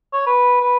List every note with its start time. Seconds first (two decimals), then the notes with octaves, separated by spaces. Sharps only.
0.13 C#5
0.27 B4
0.61 B4